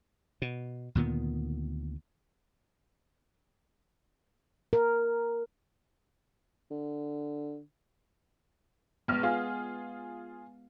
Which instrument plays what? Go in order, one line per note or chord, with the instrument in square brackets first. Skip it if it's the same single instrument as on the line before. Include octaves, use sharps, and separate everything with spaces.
[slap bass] B2
D2 A#2 D#3 B3
[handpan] A#4
[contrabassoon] D3
[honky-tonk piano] A#1 F6 [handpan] G#3 B3
[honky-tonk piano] F4 G#4 [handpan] F5